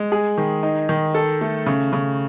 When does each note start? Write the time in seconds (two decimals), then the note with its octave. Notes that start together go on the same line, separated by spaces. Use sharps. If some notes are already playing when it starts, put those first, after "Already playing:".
Already playing: G#3
0.12 G#4
0.38 D#3
0.63 D#4
0.89 D#3
1.15 A4
1.41 A3
1.66 C#3
1.93 C#3